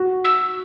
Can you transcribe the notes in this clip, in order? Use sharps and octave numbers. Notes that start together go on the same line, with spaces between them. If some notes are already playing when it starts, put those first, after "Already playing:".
Already playing: F#4
E6